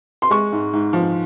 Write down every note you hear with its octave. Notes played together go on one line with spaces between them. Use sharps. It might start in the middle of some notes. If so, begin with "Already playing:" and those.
C6
G#3 C#6
G#2
G#2
F3